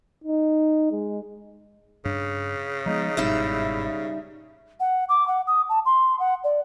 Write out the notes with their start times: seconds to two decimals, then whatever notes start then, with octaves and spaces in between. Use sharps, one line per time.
0.24 D#4
0.92 G#3
2.05 G2 C#3 D4
2.86 F3 G#3 B3 D#4
3.17 G1 G#2 B2 G3 D#4 E4 E5
4.80 F#5
5.09 D6
5.28 F#5
5.47 D#6
5.69 A5
5.85 C6
6.19 F#5
6.44 D5